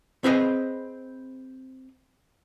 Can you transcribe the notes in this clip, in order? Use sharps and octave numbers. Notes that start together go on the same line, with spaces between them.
C4 G#4 B4 C5 D#5